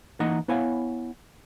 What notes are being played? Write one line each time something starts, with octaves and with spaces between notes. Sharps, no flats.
E3 A#3 D#4 D#5 F#5 A#5
B3 E4 C#5 F5 G#5